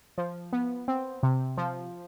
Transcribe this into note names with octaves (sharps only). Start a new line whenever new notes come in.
F3
B3
C4
C3
F3